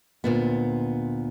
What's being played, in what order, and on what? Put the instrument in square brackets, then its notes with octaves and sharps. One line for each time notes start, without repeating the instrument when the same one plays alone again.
[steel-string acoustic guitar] D2 A#2 B3